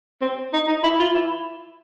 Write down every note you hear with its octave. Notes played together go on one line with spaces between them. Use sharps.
C4
D#4
D#4
E4
F4
E4